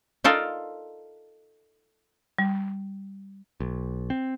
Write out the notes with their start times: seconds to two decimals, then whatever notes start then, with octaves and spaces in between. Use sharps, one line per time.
0.24 D#4 F4 A4 A#4 D5
2.39 G3
3.60 B1
4.10 C4